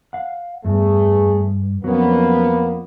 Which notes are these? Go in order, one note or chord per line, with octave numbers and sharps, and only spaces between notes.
F5 F#5
E2 G2 A3 G#4
F2 F#3 A#3 B3 C#4